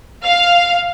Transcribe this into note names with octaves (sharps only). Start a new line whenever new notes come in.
F5